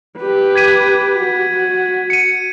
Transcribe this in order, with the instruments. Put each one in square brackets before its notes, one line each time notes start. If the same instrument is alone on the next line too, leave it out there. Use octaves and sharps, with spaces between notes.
[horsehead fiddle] G4 B4
[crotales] G#6 B6 D#7
[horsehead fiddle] F#4
[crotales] C#7 D#7